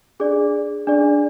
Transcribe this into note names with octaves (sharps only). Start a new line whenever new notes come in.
D4 G#4 D5
D4 G#4 D5